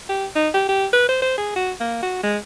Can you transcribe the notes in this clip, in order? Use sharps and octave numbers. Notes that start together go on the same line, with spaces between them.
G4
D#4
G4
G4
B4
C5
C5
G#4
F#4
A#3
F#4
G#3